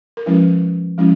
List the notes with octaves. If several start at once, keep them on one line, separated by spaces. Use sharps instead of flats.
A#4
F3 G#3 C#4 E4 B4
F3 G#3 C#4 E4